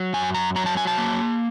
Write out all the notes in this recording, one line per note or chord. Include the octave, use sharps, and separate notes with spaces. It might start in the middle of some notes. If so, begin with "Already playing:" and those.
Already playing: F#3
F#2 G#5
A#5
F#3 A#5
A5
G#5
A5
A#3